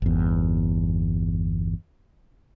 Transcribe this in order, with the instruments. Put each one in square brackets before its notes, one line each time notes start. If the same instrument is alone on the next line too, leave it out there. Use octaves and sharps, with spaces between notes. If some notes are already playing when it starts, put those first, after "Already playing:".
[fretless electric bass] G1 E2